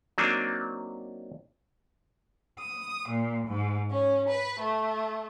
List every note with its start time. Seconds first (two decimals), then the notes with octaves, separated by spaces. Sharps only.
0.18 F#3 A#3 C4 D4 D#4
2.61 D#6
3.09 A#2
3.47 G#2
3.90 C#4
4.29 B4
4.61 A3